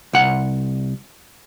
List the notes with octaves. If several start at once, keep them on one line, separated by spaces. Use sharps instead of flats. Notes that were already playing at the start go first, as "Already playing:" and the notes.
C2 F#5